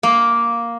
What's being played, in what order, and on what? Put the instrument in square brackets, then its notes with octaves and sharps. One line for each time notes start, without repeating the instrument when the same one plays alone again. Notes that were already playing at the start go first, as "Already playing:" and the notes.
[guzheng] A#3